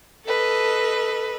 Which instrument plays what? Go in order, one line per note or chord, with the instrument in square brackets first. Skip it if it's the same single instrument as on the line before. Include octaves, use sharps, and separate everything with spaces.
[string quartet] A4 B4 D#5